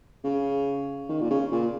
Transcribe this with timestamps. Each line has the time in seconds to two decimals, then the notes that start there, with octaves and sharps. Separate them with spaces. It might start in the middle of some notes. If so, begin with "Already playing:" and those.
0.24 C#3
1.09 D#3
1.21 A#2
1.30 C#3
1.51 A#2